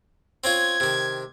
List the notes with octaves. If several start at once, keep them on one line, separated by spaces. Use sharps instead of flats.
C4 C#4 F4 G#6
C3 D#3